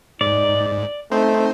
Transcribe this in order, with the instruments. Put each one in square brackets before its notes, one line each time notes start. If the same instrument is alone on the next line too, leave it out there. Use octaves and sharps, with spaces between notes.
[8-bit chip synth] G#2 [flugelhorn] D#4 [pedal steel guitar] D5
[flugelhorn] A3 [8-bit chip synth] C4 D#4 C5